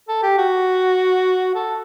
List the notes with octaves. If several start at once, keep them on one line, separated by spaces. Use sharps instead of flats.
A4
G4
F#4
A4